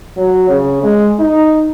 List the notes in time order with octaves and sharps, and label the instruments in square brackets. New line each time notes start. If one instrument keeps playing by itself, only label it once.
[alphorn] F#3
C#3
G#3
D#4